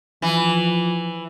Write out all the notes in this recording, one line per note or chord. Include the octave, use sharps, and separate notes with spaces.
E3 F3